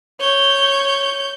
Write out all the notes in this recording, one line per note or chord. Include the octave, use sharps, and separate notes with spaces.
C#5 G6